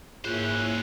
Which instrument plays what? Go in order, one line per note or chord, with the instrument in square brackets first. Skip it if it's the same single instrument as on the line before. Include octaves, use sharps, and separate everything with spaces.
[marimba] G#2 F4 [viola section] A#3 E4 C#5 [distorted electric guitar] C#4 C5 [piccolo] F#6